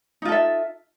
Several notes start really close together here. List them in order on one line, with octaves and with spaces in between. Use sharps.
D#4 F4 A4 E5